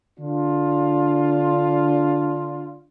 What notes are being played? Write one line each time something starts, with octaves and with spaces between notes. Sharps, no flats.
D3 D4 F4